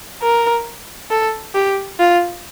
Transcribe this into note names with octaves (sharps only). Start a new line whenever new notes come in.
A#4
A4
G4
F4